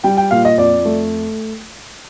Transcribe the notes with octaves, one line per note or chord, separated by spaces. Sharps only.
G3 G5
G5
A#2 F5
D#5
F2 D5
A3